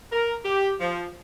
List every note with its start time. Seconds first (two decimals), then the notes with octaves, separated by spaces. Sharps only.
0.11 A#4
0.44 G4
0.80 F3